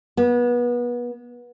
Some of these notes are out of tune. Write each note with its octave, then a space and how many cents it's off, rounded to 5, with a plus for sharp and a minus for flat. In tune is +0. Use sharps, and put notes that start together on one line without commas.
B3 -30